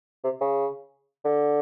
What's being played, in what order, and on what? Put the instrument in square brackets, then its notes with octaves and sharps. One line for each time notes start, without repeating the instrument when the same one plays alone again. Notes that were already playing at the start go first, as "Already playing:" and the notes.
[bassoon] C3
C#3
D3